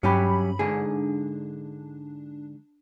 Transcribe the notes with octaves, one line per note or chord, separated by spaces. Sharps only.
G2 F#3 C#4 G4 B5
G#2 D3 D4 G#4